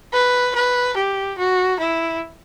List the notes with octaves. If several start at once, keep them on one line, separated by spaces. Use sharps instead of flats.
B4
B4
G4
F#4
E4